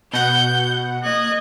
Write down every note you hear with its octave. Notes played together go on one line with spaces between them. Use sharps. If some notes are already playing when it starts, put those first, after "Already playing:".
B2 F#5 G6
A#3 D#5 F#6 G#6